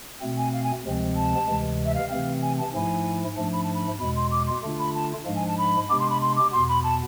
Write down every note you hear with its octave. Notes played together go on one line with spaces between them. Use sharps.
B2 A3 C4
G#5
F5
G#5
D2 C3 F3 G#3 C4
A5
D2 C3 E3 G#3
E5
F5
C3 E3 A3 C4 F5
G#5
A5
G#2 F3 A3 E4 G#5
G#2 F3 A3 D4 A5
B5
A5
B5
E2 B2 G#3 B5
C6
D6
C6
D3 A3 D4 F4
B5
A5
G#2 F3 G#3 D4 F5
G#5
A5
B5
C3 G#3 B3 D4 D6
C6
B5
C6
D6
E2 B2 B3 C6
B5
A5